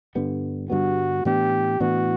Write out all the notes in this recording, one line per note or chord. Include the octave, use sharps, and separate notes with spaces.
G2 D3 G3 B3
G2 D3 G3 B3 F#4
A2 E3 B3 D4 G4
A2 E3 B3 D4 F#4